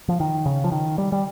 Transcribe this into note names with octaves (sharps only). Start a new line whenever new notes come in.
F3
D#3
C#3
F3
D#3
G3
G3